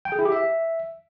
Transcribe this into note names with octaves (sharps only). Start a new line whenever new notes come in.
G5
G#4
E4
G4
E5